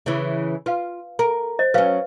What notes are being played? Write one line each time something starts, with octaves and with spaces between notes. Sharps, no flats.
C#3 E3
F4 B4 F5
A#4
C5 D#5
F#3 C#4 B4 F5